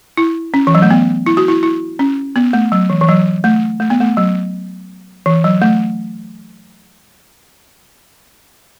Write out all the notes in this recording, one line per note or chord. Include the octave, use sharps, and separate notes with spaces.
E4
C#4
E3
F#3
A3
B3
E4
F#4
E4
E4
C#4
B3
A3
F#3
E3
E3
F#3
A3
A3
B3
A3
F#3
E3
F#3
A3